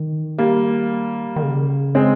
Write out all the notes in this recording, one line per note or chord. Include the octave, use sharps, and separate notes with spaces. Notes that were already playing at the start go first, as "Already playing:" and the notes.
Already playing: D#3
G3 A#3
D#3
C#3
G#3 C4